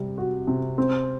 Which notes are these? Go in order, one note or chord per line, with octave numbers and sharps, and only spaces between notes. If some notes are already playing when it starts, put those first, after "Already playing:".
Already playing: C3 G3
F#4
C3
C4